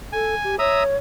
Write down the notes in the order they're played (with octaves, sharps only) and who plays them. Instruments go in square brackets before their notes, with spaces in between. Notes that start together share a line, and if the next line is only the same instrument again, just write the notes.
[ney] A4 [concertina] G#5
[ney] G4
[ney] C#5 [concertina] E5 A#5 D#6